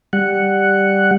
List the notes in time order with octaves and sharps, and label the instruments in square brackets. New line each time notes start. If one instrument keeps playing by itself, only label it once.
[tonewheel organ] G3 F#5